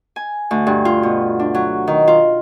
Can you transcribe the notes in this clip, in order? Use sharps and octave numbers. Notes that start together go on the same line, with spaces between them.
G#5
D2
G2
F4
B2
D4
F#3
D#3
F4